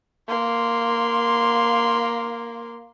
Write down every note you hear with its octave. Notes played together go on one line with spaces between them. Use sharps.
A#3 C6